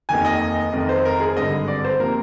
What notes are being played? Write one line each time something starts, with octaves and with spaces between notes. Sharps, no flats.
F1 D#2 D#3 G#5
D#5
F1 F2 D#3
C5
A#4
G#4
G#1 G2 D3 D#5
D5
C5
C3 F3 A#3 A#4